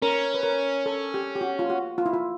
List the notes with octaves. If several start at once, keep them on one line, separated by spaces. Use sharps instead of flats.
C#4 A#4
B4
A#4
A4
G4
G4
F#4
F4
F#4
F4
E4
F4